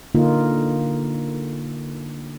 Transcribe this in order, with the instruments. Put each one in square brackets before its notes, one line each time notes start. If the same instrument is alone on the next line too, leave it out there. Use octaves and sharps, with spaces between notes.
[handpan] D3 A#3 D#4 F4